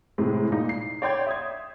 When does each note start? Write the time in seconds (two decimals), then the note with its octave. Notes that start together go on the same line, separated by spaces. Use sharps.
0.18 A2 C3 G#3
0.51 A#2 D#4
0.69 C7
1.02 C#5 D5 G5 C6 G6 G#6
1.27 E5 D#6 G#6